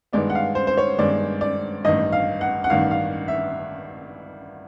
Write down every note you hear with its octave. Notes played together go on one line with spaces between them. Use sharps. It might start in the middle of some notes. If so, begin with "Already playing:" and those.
G2 D#3 G#3 B3 D5
F#5
F5
C5
C5
C#5
G2 D#3 G#3 B3 D5
D5
A1 G2 D#3 D#5
F5
F#5
F#5
A1 G2 D#3 F5
F5
E5